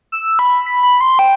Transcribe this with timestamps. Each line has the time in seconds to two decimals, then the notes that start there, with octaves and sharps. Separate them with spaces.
0.12 E6
0.39 B5
0.66 B5
0.83 B5
1.01 C6
1.19 G5